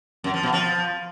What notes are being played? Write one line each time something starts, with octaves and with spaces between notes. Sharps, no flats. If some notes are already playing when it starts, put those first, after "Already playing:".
F#2
F3
B2
F3